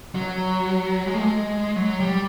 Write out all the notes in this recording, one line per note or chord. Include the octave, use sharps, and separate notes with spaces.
F#3
G#3
A3
G#3
F#3
G3